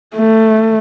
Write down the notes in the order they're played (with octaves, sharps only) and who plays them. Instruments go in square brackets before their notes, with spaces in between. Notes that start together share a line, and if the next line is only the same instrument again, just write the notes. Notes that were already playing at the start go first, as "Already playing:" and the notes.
[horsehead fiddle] A3